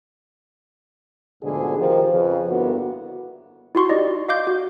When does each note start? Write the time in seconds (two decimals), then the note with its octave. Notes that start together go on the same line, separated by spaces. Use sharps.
1.43 D2 G#2 B2 D3 F3 G#4
1.78 D#3 F3 G4
2.10 F2 C#3 F3 C#4 G#4 B4
2.48 G2 D3 A#3 B3 E4 F#4
3.75 E4 F#4 C6 C#6
3.89 D#4 G4 D5 D#5
4.28 D#5 F5 D6 G6
4.47 F#4